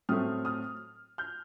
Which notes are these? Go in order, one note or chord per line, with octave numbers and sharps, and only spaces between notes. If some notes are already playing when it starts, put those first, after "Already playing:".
A2 F#3 A3 C4 D#6 F6
D#6 F6
F6 G6